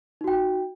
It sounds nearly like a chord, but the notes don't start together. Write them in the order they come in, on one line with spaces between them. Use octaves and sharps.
D#4 F#4 G5